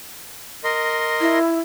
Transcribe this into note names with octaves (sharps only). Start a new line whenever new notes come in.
A#4 D#5 C6
E4